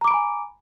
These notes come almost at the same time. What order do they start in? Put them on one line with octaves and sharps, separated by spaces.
A#5 D6 D7 B5 G#5